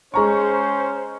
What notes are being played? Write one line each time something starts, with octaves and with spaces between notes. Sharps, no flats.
G#3 C#4 C5 A#5 C#6